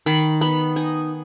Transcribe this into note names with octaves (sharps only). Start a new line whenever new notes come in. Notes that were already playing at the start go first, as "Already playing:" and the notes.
D#3 B5
B3 B5
D#4 G#5